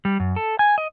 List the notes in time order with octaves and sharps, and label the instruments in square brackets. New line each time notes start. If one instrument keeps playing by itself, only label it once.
[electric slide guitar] G3
F#2
A4
G#5
D#5